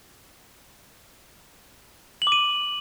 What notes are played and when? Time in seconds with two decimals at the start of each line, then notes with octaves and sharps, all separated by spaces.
2.22 F#7
2.27 D6
2.32 D#7